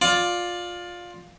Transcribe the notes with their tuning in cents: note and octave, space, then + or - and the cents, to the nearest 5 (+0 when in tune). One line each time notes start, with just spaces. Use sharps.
F4 +15 D5 +0